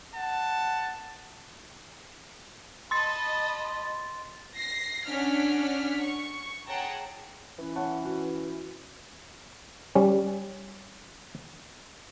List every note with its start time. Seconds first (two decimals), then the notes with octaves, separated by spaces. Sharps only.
0.15 F#5 A5
2.91 D#5 A5 B5 C6 A6
4.55 A#6 C7
5.06 C#4 D4 F#5 F6 B6
6.03 C#6
6.68 G#4 C#5 F#5 G5 A5 A#5
7.59 E3 C#4
7.76 C#5 F#5 A5
8.05 F#4
9.96 G3 C#4